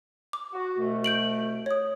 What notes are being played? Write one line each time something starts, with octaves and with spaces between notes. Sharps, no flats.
D6
F#4
C2 B2 A3
G6 D7 F#7
C#5 D#6